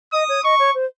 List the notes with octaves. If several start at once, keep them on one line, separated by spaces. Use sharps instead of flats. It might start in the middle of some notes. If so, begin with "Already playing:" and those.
D#5 D#6
C#5
D#5 C#6
C#5
C5